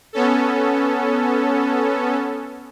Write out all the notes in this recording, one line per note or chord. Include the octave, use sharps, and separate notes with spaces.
B3 C#4 A4